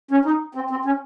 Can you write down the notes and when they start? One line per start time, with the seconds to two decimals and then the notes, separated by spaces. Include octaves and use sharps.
0.11 C#4
0.25 D#4
0.55 C4
0.70 C4
0.85 C#4